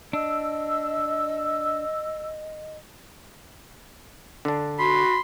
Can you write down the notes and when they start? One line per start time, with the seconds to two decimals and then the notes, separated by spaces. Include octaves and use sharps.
0.13 D4 D#5 E6
4.45 D3 D4
4.79 F#4 B5 C6